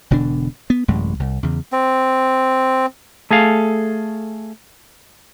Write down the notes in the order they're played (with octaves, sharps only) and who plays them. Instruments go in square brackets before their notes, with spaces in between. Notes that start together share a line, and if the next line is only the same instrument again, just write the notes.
[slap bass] E1 B2 D3 D4
B3
A1 F#2 C3 G#3
C2
E2 C#3
[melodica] C4
[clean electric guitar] A3 G#4 A4 F5